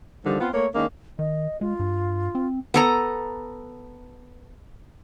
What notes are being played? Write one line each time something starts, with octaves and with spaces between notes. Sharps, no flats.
D3 D#3 F3 G3
B3 C4 F4
A3 A#3 C#5
D#3 G#3 A#3 C#4 D4
D#3 D#5
G#3 F4
G2
C4
B3 A4 A#5